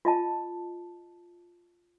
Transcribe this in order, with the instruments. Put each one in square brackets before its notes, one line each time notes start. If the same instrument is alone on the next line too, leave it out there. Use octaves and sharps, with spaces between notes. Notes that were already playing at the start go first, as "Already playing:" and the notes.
[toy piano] F4 D#5 A5